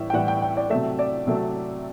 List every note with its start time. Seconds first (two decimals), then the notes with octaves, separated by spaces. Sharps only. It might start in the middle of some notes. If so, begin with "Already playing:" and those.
Already playing: A2 E3 G3 E5
0.10 G5
0.13 A2 E3 G3 F#5
0.28 G5
0.42 G5
0.57 D5
0.70 C3 F#3 A3 E5
0.99 D5
1.27 C3 F#3 A3